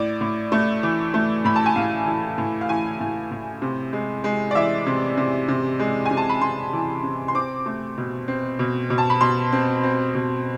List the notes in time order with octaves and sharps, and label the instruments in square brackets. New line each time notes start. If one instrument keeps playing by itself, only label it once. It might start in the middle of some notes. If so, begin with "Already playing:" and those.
Already playing: [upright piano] A2 D5
A2
A3
E3
A3
A2 B5
A5
G#5
A2 F5
E3
A2
F5
E3 G#5
A2
A2
C3
G#3
G#3
D5
E3 E5
C3
C3
C3
G#3
G#5
C3
A5
B5
C3 C6
E3
C3
C6
C4 D6
A3
B2
C4
B2
B2
A5
B5
B2 C6
C4
C4
B2